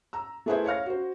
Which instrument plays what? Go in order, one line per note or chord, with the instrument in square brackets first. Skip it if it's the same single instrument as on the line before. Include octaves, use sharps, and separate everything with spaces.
[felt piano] A#5 E6
A3 E4 G#4 B4 C5 E5
C#5 F5 F6 A#6
F#4 C5